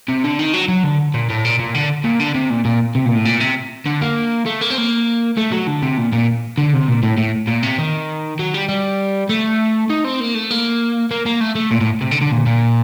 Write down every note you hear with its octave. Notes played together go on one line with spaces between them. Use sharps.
C3
D3
D#3
F#3
F#3
D3
A#2
A2
A#2
A#2
D3
A#2
D3
C3
A#2
A#2
C3
A#2
A2
A#2
C3
D3
A#3
A3
A#3
C4
A#3
A3
F#3
D3
C3
A#2
A#2
D3
C3
A#2
A2
A2
A#2
C3
D#3
F#3
G3
G3
A3
D#4
C4
A#3
A3
A#3
A#3
A#3
A3
A3
A#2
A2
C3
D3
D3
A#2
A#2